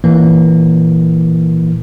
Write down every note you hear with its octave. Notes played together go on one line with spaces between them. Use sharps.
A#2 E3 A#3